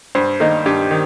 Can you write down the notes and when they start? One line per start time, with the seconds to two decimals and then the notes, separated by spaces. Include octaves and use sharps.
0.15 G2 C5
0.40 D#3 A#3 D#4
0.66 G2 G4
0.91 D#3